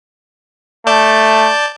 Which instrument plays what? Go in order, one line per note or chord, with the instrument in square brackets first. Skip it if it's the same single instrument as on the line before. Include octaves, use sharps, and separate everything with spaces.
[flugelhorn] A3 [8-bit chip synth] D5 A5 G6